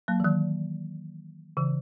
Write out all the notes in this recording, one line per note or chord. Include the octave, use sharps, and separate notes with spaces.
F#3 A#3
E3
D#3 F#3
C#3 E3